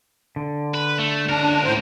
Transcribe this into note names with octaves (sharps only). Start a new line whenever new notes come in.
D3
B4
A3
C#2 D4 A#4
A2 C5